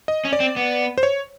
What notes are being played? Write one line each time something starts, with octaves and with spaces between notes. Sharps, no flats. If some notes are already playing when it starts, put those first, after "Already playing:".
D#5
C#4
D5
C4
B3
C5
C#5